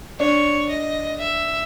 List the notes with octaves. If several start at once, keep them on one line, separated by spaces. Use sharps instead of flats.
D4 C#5
D#5
E5